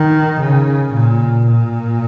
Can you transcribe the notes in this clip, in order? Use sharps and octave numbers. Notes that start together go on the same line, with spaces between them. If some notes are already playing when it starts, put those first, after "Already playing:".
Already playing: D#3
C#3
A#2
A#2